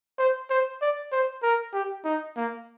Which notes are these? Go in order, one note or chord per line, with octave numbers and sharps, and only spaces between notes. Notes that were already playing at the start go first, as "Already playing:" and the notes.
C5
C5
D5
C5
A#4
G4
D#4
A#3